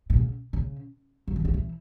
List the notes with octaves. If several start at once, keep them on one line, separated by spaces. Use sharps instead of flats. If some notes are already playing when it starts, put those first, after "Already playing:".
B2
C#3
C#3
F#3
E3
D#3
E3